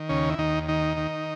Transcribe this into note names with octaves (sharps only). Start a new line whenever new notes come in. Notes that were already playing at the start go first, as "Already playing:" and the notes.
Already playing: D#3
D#2 C#3 C#4
E4
D#2 D#3 D#4
D#3 D#4
D#3